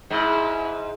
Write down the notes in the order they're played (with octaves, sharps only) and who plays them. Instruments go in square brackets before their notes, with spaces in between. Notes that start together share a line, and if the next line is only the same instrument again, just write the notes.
[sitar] G#2 [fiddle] E4